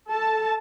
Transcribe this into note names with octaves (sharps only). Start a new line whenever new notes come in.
A4 A5